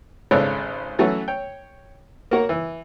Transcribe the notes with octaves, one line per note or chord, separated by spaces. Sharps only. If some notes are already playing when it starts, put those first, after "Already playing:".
G#1 C#3 A4 B4 C#5 D5
E3 F#3 A3 C#4 F#4 B4
C#5 G5
A#3 F#4 A#4 C#5
E3